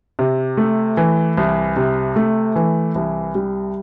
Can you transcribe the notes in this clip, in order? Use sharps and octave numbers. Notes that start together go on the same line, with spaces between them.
C3
A3
E3
C2
C3
A3
E3
C2
G3